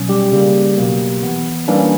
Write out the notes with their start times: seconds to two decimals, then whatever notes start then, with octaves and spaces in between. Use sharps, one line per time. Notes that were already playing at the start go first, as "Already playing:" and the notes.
Already playing: B2 F#3 C#4
0.09 G3 G4
0.32 C#3 G3 A#3
0.77 B2 F#3 A#3
1.23 E3 B3
1.68 E3 G3 A#3 C#4 D4